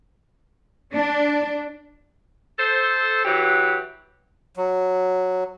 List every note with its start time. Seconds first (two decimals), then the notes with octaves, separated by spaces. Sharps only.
0.92 D4
2.57 A4 C5
3.24 E3 F#3 F#4 G4
4.57 F#3